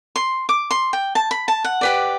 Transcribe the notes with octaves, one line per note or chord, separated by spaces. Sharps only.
C6
D6
C6
G5
A5
B5
A5
F#5
G4 B4 D5